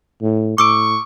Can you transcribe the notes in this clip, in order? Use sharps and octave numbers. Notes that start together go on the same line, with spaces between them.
A2
A2 C#6 D6 E6 D7